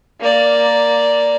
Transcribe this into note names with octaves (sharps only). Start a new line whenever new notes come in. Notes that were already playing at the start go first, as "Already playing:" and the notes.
A#3 D5